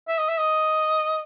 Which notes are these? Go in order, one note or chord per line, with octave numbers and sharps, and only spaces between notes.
E5
D#5
E5
D#5